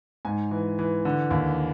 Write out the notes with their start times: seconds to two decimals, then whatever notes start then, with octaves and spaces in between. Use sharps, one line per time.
0.25 G#2 G#5
0.51 E3
0.79 E3
1.05 D3
1.30 D#2